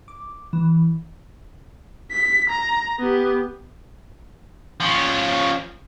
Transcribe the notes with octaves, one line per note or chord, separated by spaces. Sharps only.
D6
E3
B6
A#5
B3 G4
F3 C#4